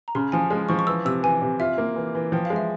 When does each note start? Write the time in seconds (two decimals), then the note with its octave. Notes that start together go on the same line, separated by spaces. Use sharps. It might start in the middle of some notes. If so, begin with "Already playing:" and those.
0.08 A#5
0.15 C#3 C6
0.32 F3 G#5
0.50 G#3
0.69 F3 C#6
0.79 C#6
0.87 E3 E6
1.05 C3 E6
1.23 E3 G#5
1.42 C3
1.60 F4 E5
1.78 A#3
1.96 E3
2.15 E3
2.32 F3 G5
2.45 F5
2.50 G#3
2.56 E5